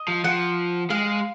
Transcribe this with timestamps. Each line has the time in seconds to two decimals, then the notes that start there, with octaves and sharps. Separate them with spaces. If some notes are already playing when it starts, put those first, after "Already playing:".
Already playing: D#5
0.08 F3
0.24 F3 F#5
0.90 G#3 F5